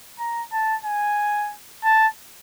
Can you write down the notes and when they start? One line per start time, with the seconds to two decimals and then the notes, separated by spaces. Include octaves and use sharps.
0.19 A#5
0.53 A5
0.84 G#5
1.84 A5